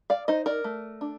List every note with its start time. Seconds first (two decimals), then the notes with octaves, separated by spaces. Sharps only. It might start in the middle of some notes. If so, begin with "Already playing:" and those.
0.10 D5 F5
0.28 D#4 C5 D#5
0.46 A#4 D5
0.64 A3
1.01 D4